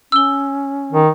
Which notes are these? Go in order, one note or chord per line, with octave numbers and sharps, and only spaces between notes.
C#4 E6 G7
D#3